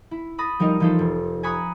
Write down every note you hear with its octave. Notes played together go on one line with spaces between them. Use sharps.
E4
B5 D#6 A6 A#6
F3 G3 D#4 A#4 D#5
E3 F3 D#4 F4 A4 C5
F1
G#5 A#5 B5 C#6 D#6 F#6